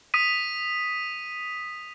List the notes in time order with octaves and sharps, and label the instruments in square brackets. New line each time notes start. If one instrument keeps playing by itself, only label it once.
[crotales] D#6 B6 D#7